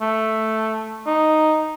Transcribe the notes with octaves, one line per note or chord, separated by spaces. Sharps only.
A3
D#4